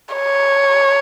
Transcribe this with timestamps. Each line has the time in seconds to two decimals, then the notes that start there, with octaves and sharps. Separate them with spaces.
0.15 C#5